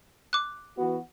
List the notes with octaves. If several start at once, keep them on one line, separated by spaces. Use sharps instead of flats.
D6 F#6
E3 B3 F#4